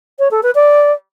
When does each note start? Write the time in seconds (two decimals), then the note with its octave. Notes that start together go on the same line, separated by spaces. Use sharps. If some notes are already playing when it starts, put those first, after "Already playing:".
0.19 C#5
0.31 A4
0.43 B4
0.55 D5